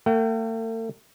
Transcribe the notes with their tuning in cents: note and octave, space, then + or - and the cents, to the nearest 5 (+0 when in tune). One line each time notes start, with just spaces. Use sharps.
A3 +45 G5 -45